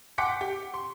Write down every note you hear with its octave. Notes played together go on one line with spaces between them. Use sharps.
F#5 G5 C6 D6 B6 C#7
G4
C6